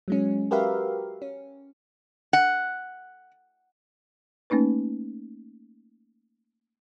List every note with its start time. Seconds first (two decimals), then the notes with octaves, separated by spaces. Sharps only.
0.08 F#3 G#3 C#4
0.51 F#4 G4 A#4 B4 E5 F5
1.22 C#4
2.33 F#5
4.50 A3 A#3 C#4 D#4 B4